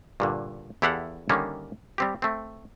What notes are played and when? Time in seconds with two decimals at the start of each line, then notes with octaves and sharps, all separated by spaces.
0.20 G2 A#2 D3
0.82 E2 E4 G4 A4 F5 F#5
1.29 D3 D#3 G3 A#3 C#4
1.98 G3 C4 G4
2.22 A3 C4